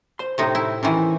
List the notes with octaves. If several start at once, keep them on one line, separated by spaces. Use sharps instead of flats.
C5 C6
A2 C3 D#4
E4 G5
C3 D#3 E3 C#4 E4